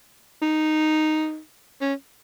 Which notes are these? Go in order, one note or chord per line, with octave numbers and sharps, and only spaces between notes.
D#4
C#4